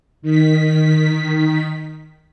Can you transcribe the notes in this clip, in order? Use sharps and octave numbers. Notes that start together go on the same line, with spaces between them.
D#3 B6